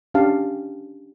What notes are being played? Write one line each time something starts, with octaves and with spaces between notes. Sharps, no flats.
C#4 D4 G4 F5 A5